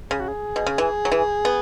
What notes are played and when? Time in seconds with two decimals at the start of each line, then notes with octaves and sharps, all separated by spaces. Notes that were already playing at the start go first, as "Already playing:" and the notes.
0.11 C#3 G#4
0.20 F#4
0.28 G#4
0.56 B2
0.66 C#3
0.78 E3
1.05 F#3
1.12 E3
1.45 B3